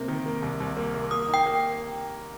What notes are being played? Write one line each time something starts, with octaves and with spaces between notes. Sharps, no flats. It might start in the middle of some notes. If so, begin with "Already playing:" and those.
Already playing: C3 A#3
D#3
A#3
C2
C2
A#3
A#3
A#3 D#6
D#4
G5
A#3